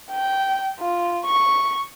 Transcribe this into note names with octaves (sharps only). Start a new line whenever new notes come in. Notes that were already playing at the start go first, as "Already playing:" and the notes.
G5
F4
C#6